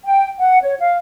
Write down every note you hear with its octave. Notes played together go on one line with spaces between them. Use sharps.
G5
F#5
C#5
F5